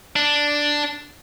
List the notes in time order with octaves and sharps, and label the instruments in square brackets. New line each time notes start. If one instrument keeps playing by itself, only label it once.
[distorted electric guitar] D4